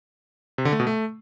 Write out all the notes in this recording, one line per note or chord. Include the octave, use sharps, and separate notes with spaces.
C3
D3
A3
B2
A3